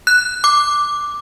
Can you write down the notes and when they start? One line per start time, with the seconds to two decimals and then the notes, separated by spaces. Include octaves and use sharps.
0.07 F#6
0.44 D6